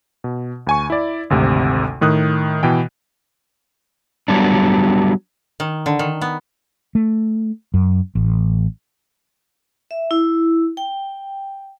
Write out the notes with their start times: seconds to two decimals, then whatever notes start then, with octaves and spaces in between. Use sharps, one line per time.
0.24 B2
0.67 D2 G#5 C#6
0.90 E4 D5
1.30 G#1 D2 C3
2.01 A2 D#3 D#6 F#6
2.63 B2 E3 G5
4.28 F#3 G3 B3 D4
5.60 D#3
5.86 D3
5.99 D#3
6.21 B3
6.95 A3
7.74 F#2
8.15 A1
9.91 E5
10.11 E4
10.77 G5